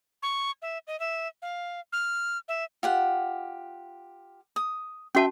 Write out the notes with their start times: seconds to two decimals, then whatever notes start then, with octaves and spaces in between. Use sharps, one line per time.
0.23 C#6
0.62 E5
0.87 D#5
1.00 E5
1.42 F5
1.93 F6
2.48 E5
2.83 F4 G4 F#5
4.56 D#6
5.15 C#4 F#4 E5 G5 A5